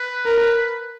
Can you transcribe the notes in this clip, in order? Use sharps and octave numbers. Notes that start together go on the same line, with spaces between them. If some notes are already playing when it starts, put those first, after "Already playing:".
Already playing: B4
A#4